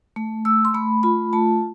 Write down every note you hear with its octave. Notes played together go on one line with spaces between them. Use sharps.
A3
A3 E6
C6
A3 B5
F4 B5
A3 A5